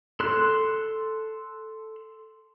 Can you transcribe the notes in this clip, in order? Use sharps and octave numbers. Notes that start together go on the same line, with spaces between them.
A4 C6 F#6